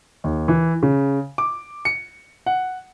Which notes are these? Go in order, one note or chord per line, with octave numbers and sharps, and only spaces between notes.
D#2
E3
C#3
D6
C#7
F#5